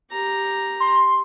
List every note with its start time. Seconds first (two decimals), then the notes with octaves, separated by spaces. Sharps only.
0.12 G4 A#5
0.80 C6